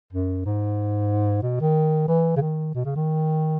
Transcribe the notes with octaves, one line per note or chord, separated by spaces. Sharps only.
F#2
G#2
B2
D#3
E3
C#3
D#3
B2
C#3
D#3